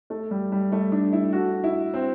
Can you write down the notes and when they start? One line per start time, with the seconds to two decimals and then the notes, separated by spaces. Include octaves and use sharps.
0.10 A3
0.31 G3
0.52 G3
0.72 A3
0.92 D4
1.13 E4
1.33 F#4
1.64 E4
1.94 C4